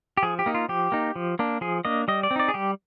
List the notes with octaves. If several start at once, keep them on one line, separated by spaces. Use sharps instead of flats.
G4
F3 G#4
G4
A#3 D#4
F4
F3 G4
A#3 D#4
F3
A#3 D4
F3 G#4
A#3 D4 D#5
G3 D#5
D5
C4
D#4 D5
G#4
G3 G4